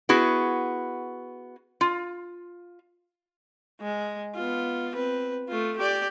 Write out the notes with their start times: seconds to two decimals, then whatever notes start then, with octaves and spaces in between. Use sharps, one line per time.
0.09 B3 E4 F#4 G#4
1.81 F4
3.80 G#3
4.35 B3 F4
4.95 C4 B4
5.49 A3 F4
5.78 G4 D5